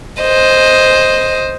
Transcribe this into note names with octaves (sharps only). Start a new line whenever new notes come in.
C5 D#5